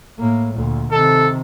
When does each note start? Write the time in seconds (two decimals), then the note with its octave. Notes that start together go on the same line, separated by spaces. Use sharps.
0.19 A2 A#3
0.53 D2 A#2
0.91 C3 D#3 A4